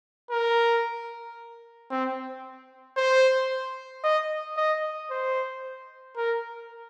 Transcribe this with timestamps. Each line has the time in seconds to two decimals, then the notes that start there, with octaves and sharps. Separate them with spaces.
0.30 A#4
1.91 C4
2.97 C5
4.04 D#5
4.57 D#5
5.10 C5
6.17 A#4